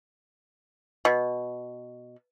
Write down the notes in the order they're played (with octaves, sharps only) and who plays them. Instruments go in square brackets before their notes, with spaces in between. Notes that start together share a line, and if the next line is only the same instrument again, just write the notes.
[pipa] B2